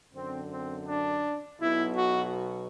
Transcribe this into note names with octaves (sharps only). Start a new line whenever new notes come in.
F#2 D3 C4
C4
D4
B1 B2 E4
F#4